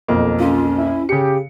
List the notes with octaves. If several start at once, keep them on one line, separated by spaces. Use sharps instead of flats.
B1 F2 A#3
C#4 F4
E4
C#3 G4 C#7